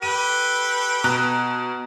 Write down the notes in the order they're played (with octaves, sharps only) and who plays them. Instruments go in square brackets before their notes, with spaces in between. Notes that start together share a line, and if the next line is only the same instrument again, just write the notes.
[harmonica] G4 A4 B4 [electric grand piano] D#7
[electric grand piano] B2 A#5 F#6